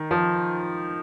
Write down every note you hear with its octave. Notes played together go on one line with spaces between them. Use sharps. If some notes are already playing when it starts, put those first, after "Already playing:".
Already playing: D#3
F3